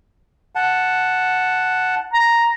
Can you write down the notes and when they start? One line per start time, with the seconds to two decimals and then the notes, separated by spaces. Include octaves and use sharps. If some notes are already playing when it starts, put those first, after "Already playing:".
0.55 F#5 A5
2.13 A#5